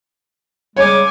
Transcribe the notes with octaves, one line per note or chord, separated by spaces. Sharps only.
C#3 G3 G#3 C#5 G#5 D6